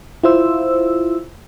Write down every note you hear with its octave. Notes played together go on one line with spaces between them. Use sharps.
E4 F4 C5 E6